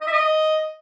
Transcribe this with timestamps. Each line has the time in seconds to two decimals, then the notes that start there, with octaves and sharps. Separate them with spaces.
0.01 D#5
0.07 E5
0.12 D#5